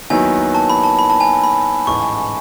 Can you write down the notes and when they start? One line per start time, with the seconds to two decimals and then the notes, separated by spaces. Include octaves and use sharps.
0.10 D#2 D#3 F#3 B3 E4 G#5
0.55 A5
0.70 B5
0.84 A5
0.99 B5
1.10 A5
1.21 G#5
1.43 B5
1.87 A1 G#2 E3 C#6